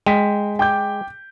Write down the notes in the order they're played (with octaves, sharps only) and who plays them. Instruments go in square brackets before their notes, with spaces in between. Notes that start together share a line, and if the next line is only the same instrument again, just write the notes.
[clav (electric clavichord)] G#3 [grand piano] G5 B6
[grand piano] G5 D6 G6